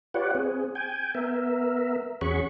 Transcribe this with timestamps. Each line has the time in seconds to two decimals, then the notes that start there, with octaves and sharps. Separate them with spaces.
0.14 F4 G4 B4 C#5 D5 F#5
0.35 C4 G#4
0.75 G5 G#5
1.15 B3 A#4 E5
2.21 E2 C#4 F#4 G#4 B5 C#6